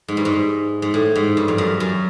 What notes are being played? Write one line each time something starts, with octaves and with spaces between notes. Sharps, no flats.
G#2
G2
G#2
G#2
A2
G#2
G2
F2
F#2
F#2